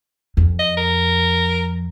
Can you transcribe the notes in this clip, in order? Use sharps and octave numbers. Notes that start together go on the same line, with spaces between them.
F2
D#5
A#4